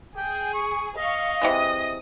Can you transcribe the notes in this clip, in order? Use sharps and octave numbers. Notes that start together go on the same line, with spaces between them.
G#4 G5
C#6
D#5 F5 C#6
C3 E3 G#3 D#6